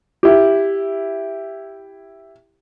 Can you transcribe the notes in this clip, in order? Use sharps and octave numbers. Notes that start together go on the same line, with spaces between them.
E4 G4